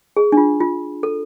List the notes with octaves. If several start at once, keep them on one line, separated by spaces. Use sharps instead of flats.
G#4
D4
F4
F4
A4